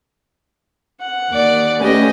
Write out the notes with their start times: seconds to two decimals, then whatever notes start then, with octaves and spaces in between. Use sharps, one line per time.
1.00 F#5
1.29 D#2 D5
1.80 A3 C#4 G4 B4 D#5 G#5